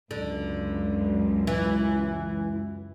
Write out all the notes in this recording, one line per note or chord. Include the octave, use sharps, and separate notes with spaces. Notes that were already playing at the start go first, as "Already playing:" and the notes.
C#2 F#2 D3
E3